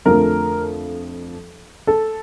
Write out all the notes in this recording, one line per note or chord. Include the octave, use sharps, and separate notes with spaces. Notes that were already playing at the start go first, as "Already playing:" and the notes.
F2 D3 F3 A3 A#4
A4